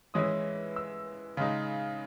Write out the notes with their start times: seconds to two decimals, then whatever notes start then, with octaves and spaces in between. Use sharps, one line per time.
0.14 E3 G#3 C#4 E4 D#6
0.76 E6
1.37 C#3 G#3 D#4